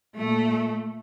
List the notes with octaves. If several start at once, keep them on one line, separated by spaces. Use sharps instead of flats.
A#2 A3